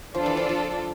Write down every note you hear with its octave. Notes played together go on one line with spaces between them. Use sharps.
F3 D4 F4 A4 D5
E3
F3
F3